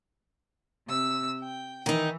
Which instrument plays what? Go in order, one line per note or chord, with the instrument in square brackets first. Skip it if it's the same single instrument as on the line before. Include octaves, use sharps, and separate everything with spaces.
[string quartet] C3 E6
G5
[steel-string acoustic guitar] D#3 D#4 [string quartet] E3